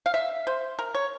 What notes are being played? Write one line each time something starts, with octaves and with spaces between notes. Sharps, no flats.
F5
E5
C5
A#4
C#5